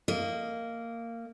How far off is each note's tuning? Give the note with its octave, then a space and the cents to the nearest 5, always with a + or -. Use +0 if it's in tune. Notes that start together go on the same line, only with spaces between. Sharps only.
A#3 -15 D#5 +0